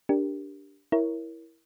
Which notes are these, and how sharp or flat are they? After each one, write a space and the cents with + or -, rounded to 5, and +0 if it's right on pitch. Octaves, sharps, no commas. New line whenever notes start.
D4 -5 G4 +0 A#4 +0
E4 +0 A#4 +10 C#5 +0